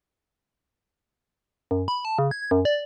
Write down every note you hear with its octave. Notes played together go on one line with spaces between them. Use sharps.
F#2
B5
A5
C#3
G#6
F#2
D5